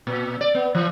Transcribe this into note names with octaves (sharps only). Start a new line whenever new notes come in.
A#2
D5
B3
E3